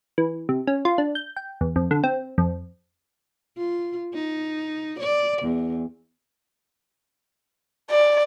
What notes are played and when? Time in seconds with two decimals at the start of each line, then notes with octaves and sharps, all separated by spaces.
0.18 E3
0.49 C3
0.67 C#4
0.85 F4
0.98 D4
1.15 G6
1.36 G5
1.61 E2
1.76 F2
1.91 D3
2.04 C4
2.38 F2
3.57 F4
4.14 D#4
4.99 D5
5.42 E2
7.90 D5